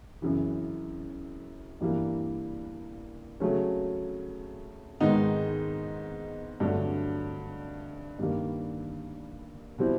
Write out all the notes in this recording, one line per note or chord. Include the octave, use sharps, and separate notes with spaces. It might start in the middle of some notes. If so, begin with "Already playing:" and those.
F#2 C#3 E3
G2 E3 G3 A#3
C#3 F#3 A3 C#4
G#2 D#3 G#3 B3 D#4
G2 D3 F#3 A3 D4
G2 D#3 G3 A#3
B2 G3 C4 E4